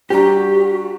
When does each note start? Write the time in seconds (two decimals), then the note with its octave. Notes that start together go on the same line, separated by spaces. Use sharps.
0.10 G3 D4 F#4 G4 A#5